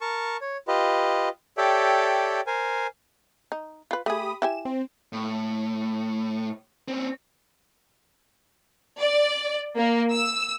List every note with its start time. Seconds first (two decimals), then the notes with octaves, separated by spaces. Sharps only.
0.01 A#4 A5 C#6
0.41 C#5
0.68 F4 G4 B4 D#5
1.57 G4 A4 C#5 D5 E5 G5
2.47 A#4 C5 G#5
3.52 D#4
3.91 F4 B4
4.06 A3 G4 G#4 B5 D#6
4.42 E4 G4 G#5 E7
4.65 C4
5.13 A2
6.88 C4 C#4
8.99 D5
9.76 A#3
10.12 E6